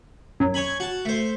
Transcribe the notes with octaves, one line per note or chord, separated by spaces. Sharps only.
F#2
C#5 G#5 B5
F#4 A5
A3 C5